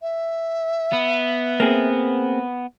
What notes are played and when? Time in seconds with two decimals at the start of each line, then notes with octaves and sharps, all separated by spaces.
0.02 E5
0.93 B3
1.60 A#3 C4 G#4